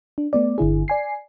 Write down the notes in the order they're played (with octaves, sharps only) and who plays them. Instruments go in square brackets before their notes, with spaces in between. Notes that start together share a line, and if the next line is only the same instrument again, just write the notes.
[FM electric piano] D4
A3 B3 D5
G1 D3 E4 G#4
D5 G#5 C7